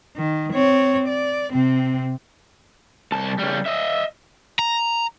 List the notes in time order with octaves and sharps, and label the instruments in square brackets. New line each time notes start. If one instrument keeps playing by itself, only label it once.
[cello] D#3
C4 C#5
D5
C3 C4
[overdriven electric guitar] C2 A5
C#3 G3
D#5 E5
A#5